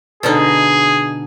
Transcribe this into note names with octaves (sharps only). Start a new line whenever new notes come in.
B2 D3 D#4 G#4